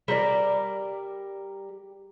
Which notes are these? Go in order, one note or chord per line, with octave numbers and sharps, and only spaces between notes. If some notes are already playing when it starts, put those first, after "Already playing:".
G3 A#4 B4 D5